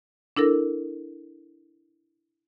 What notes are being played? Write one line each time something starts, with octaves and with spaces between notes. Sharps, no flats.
D4 E4 A4 A#4